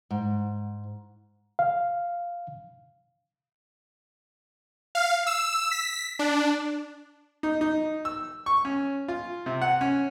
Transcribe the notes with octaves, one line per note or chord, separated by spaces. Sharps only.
G#2
F5
F5
E6
B6
D4
D#4
D#4
E6
C#6
C#4
F4
C3
F#5
C#4